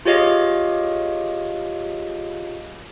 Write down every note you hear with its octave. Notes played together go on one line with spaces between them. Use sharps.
F4 G4 G#4 C#5 D#5 F5